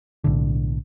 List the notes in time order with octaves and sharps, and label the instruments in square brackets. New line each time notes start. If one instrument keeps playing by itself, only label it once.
[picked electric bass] B1 A2 D3